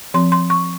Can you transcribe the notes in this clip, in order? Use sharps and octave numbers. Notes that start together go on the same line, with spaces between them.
F3 C4 C6
C6
C#6